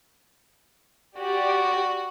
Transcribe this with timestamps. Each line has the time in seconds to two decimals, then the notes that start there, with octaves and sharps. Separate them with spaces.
1.18 F#4 G4 D5